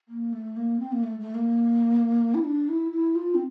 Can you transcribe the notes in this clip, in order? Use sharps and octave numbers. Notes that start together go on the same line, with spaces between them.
A#3
A3
A#3
C4
A#3
A3
A3
A#3
E4
D4
E4
E4
F4
C4